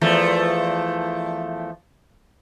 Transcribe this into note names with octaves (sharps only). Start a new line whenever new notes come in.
E2 F3 A3